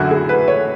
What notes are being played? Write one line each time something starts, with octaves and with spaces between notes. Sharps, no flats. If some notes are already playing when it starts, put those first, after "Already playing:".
Already playing: F#2 D3 F#3 E4 F#4
G#4
B4
C#5